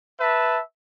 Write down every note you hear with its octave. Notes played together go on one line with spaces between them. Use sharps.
B4 E5 A5